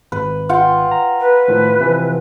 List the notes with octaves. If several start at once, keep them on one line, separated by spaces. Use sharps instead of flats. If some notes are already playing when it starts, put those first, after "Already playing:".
G#1 B4
F4 F#5 G5
A#5
B4
A2 D#3 F3
C3 E3 F3